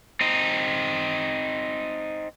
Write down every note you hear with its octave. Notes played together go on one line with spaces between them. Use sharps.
C4 D#4